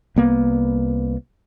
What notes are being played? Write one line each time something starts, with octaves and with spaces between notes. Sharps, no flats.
C2 A#3 B3